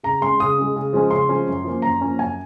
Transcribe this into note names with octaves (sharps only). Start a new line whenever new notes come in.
C#3 A#5
G#3 C#4 C6
C#3 D#6
G#3 C#4
C#3
F3 G#3 C#4
C#3 C6
F3 G#3 C#4
F#2
F3 A#3 C#4
F#2 A#5
F3 A#3 C#4
F#2 G#5